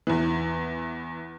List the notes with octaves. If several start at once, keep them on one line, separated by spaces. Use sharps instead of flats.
E2 E3